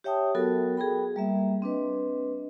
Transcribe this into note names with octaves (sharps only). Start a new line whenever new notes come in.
G4 C#5 E5 G5 A5 D#6
F#3 B3 F#4 A4 A#4 G5
G#4 A#4 G5 B5
G3 A#3 E5
C4 D4 B4 D#5